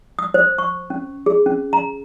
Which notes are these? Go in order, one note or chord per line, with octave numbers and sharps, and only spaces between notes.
D#6
C5
C#6
C#4
G#4
C#4
A#5